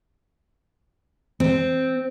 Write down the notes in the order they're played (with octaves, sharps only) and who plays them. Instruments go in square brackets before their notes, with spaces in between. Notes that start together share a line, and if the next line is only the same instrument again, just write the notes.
[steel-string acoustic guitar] C4